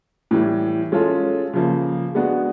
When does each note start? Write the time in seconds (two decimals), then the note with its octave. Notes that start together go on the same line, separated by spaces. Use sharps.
0.31 A2 E3 G3
0.92 G#3 C#4 F4 A4
1.53 C#3 F3 A#3
2.15 G#3 B3 D4 F#4